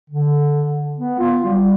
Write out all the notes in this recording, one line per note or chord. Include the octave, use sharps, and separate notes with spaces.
D3
B3
F4
G3